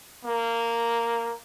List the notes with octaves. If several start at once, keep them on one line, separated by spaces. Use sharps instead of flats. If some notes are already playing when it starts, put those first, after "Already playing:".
A#3